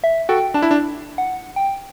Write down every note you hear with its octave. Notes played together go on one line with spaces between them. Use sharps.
E5
F#4 A4 G5
D4 A5
E4
D4
F#5
G5